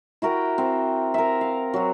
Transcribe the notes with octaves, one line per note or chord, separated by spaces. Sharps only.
E4 F#4 A#4 G5
C4
A#4 E5
F5
F#3 F#4